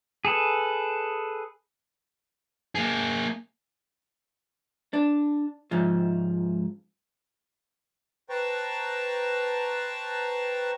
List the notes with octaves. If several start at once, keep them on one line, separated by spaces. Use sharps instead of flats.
G#4 A4 B4
A#3 G#4
D4
C#2 G#2 F3
B4 C5 G5 A5 A#5 C#6